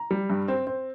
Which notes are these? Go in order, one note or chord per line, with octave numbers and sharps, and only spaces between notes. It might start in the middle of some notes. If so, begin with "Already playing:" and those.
Already playing: A#5
G3
G2
C4
C4